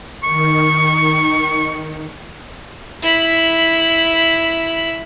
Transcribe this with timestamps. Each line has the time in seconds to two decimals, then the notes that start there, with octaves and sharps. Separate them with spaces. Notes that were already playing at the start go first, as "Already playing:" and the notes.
0.24 D#3 C#6
3.02 E4 B5